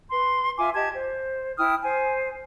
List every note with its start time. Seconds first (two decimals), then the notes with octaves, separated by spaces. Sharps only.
0.11 B4 C6
0.58 F4 E5 G#5 D6
0.75 G4 D#5 A5 G#6
0.95 C5
1.58 E4 G5 D#6 F6
1.82 C5 G#5